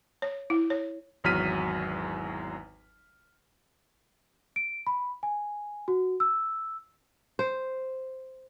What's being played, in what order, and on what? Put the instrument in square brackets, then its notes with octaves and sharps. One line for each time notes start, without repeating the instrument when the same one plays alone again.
[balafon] C#5
E4
C#5
[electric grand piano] G#1 E2 F#3 F6 B6 D#7
[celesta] D7
B5
G#5
F#4
E6
[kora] C5